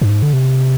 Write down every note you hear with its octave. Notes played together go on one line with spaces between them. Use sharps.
G2
G#2
D3
C3